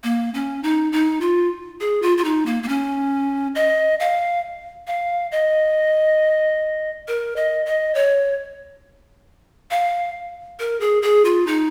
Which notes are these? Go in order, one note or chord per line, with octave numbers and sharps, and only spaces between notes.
A#3
C#4
D#4
D#4
F4
G#4
F4
F4
D#4
A#3
A#3
C#4
D#5
F5
F5
D#5
A#4
D#5
D#5
C#5
F5
A#4
G#4
G#4
F4
D#4